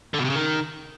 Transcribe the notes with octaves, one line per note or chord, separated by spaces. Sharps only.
D3
B2
C3
C#3
D#3